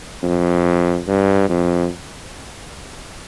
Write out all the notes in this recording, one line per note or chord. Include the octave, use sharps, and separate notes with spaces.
F2
G2
F2